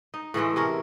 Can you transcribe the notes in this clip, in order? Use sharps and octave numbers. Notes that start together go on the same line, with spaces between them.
D#4
A2 E3 G#3 A3
C3 C#4 A#4